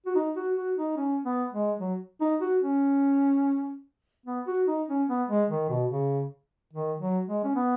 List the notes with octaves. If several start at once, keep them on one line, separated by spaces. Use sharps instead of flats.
F#4
D#4
F#4
F#4
D#4
C#4
B3
G#3
F#3
D#4
F#4
C#4
B3
F#4
D#4
C#4
B3
G#3
D#3
B2
C#3
D#3
F#3
G#3
C#4
B3